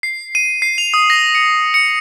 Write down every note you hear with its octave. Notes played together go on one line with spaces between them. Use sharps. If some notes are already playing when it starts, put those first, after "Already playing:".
C7
D#7
C7
F7
D#6
A#6
C#7
C#7